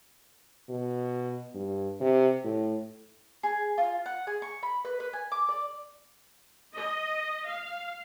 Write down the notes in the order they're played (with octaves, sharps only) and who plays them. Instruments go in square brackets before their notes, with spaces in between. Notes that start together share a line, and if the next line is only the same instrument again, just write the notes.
[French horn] B2
G2
C3
A2
[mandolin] G#4
F4
F#5
G#4
C#6
B5
B4
B4
G#5
D6
D5
[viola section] D#5
F5